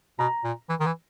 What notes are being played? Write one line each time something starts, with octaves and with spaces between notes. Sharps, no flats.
B2 A#5
A#2
E3
D#3
E3